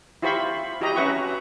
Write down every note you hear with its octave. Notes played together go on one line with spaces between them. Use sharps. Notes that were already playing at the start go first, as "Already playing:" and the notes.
E4 F4 G4 C5 B5 C#6
E4 F#4 G4 D#5 A#5 B5
C#4 F#4 B4 E5 F#5 C#6